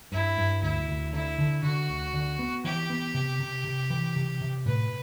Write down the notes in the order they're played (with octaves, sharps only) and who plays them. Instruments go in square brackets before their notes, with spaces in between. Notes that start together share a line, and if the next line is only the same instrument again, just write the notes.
[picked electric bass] G2 [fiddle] E4
[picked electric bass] G2
[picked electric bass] D2 [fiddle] E4
[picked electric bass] D2
[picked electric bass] D3 [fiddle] E4
[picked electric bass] D3
[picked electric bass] D3 [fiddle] F#4
[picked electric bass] D2
D3
B3
[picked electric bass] E3 [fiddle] G4
[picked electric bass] B3
C3
C3
C3
E3
C3
C3
[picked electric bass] A2 [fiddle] B4